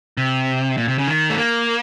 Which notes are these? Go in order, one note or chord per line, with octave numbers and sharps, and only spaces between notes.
C3
A#2
C3
C#3
D#3
A3
A#3